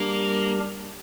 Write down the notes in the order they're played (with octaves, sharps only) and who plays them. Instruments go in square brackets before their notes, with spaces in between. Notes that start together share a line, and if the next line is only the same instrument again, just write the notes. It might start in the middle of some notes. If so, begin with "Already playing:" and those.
Already playing: [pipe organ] G3 D4 G4 A#4 [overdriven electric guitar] A#3